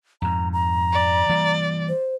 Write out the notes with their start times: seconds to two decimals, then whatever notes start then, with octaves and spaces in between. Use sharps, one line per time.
0.22 F2 G#2 A#5
0.53 A#5
0.93 D5
1.29 E3 G3 A#3
1.89 C5